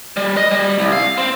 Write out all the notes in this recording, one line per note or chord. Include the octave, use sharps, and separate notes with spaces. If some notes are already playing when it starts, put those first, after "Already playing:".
G3
D#5
G3
C2
F5
C4